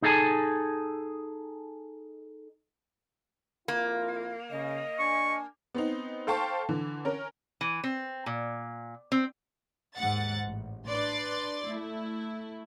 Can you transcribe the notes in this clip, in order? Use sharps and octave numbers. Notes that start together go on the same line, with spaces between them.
D#4 G#4 A4 E5 G#5 A5
F2 A#3 E4 F4
C#3 D#5
D4 G#5 C#6
B3 C4 D#4
A4 C5 F5 G5 A5 C#6
D3 E3
C#4 A#4
E3
C4
A#2
C4
D#2 G#2 F#5 A6
A1
D4 B4 D5 C6 A6
A3 E4